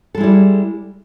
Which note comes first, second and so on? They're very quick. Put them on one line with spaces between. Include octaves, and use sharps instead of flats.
A4 G#3 E4 G3